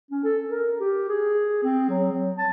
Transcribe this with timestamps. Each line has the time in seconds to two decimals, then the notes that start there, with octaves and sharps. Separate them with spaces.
0.11 C#4
0.24 A4
0.50 A#4
0.80 G4
1.08 G#4
1.64 C4
1.90 F#3
2.11 F#3
2.38 A5